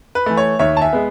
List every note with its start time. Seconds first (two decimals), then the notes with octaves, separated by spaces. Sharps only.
0.15 B4
0.26 E3 A3
0.37 C#5
0.59 D#2 C#5 E5
0.77 A5
0.82 E5 G#5
0.93 G#3 B3